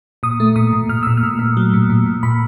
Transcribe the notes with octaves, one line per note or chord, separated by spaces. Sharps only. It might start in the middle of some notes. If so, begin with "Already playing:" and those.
A#2 D#6
A3
A#2 D#6
A#2
A#2 F6
A#2 E6
F6
A#2
A#2
F#3
A#2
A#2
A#2
A#2 B5